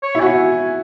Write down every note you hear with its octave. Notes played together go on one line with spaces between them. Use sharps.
C#5
E4
F#4 G#5
E4